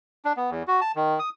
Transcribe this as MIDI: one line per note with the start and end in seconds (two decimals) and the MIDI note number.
0.25 0.33 62
0.37 0.50 59
0.50 0.63 40
0.68 0.80 66
0.81 0.92 81
0.96 1.19 51
1.19 1.29 87